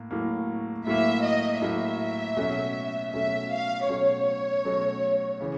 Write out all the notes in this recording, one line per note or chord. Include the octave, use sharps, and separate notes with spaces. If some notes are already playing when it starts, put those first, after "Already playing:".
Already playing: A2 A#3
A2 F#3 A#3
A2 F#3 A#3 E5
D#5
A2 F#3 A#3 E5
B2 F#3 A3 C#4
B2 F#3 A3 C#4 E5
F5
B2 F#3 A3 C#4 C#5
B2 F#3 A3 C#4
C#3 E3